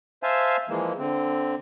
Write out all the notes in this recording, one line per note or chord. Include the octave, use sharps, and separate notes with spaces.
C5 E5 F5 G#5 A5
E3 F3 G#3 A#3
D3 C4